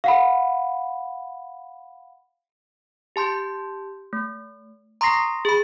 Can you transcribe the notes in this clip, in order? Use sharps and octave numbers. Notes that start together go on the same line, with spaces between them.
F5 F#5 B5
G4 A5 C6 G6
A3
A#5 C6 C#6 D#6 A#6 C7
G#4 B5